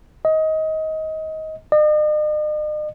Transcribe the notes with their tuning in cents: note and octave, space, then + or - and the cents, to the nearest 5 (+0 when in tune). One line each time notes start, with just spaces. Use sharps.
D#5 +20
D#5 -45